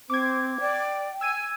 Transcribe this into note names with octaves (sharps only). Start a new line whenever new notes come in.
C4 C5 D6 G#6
D5 G5
G#5 E6 G#6 D#7